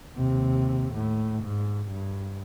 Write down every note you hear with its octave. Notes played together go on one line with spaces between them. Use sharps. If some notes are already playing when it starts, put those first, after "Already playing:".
D#2 C3
A2
G#2
G2